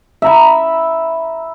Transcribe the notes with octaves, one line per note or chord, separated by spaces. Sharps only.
E5 A#5 B5